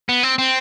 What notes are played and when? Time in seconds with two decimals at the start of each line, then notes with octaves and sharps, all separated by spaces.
0.09 B3
0.23 C4
0.38 C4